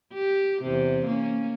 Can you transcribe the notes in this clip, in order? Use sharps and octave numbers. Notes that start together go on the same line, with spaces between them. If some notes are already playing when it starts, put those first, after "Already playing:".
G4
E2 C3
A#3 C#4